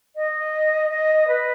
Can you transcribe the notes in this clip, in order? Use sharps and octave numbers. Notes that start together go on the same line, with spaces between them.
D#5
D#5
B4